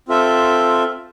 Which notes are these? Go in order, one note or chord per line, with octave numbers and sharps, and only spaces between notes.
C4 F4 A4 E5